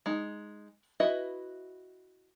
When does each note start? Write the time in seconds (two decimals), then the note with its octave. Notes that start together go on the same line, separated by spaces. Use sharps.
0.06 G#3 D#4
1.00 E4 F#4 B4 D#5 E5